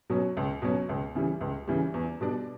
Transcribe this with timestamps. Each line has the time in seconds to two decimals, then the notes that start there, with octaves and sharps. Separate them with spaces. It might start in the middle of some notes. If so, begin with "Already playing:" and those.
0.10 B2 F#3 C#4
0.37 C#2
0.62 B2 F#3 C#4
0.89 C#2
1.15 C#3 E3 G3
1.41 C#2
1.68 C#3 E3 G3
1.94 E2
2.21 B2 G3 D4